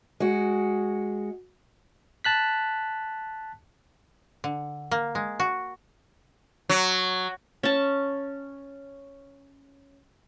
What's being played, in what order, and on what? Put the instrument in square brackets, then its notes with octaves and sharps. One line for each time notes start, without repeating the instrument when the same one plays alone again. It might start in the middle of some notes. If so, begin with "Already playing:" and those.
[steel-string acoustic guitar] G#3 F#4
[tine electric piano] A5 F#6 B6
[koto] D3
A#3
G#3
F#4
[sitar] F#3
[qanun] C#4 A5